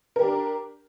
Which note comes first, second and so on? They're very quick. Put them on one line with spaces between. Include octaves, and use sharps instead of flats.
A#4 G4 D4